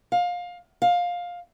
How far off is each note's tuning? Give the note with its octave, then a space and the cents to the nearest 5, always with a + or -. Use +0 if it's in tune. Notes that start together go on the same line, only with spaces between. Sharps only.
F5 +20
F5 +15